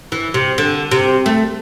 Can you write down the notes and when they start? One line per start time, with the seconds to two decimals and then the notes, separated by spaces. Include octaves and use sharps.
0.12 E3
0.34 C3
0.58 D3
0.91 C3
1.26 A3